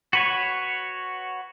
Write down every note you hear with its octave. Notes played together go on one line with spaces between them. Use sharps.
F#4 B4 C#5